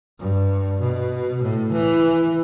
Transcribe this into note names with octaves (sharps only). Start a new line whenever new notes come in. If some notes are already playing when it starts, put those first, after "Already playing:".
G2
B2
A2
E3